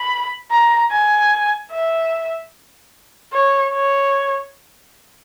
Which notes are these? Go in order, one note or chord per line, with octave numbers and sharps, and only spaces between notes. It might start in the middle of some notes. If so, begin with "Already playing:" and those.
Already playing: B5
A#5
G#5
E5
C#5
C#5